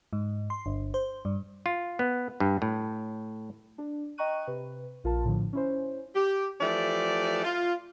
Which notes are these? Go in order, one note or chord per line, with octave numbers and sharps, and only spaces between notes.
G#2
C6
G1
C5
G2
F4
B3
G2
A2
D4
D#5 G5 A#5 C#6 F#6 D#7
C3 B4
A#1 F4 A#4 A5
A2 D3 F3
C#4 E4 C5
G4
E3 F3 A3 G4 D5
F4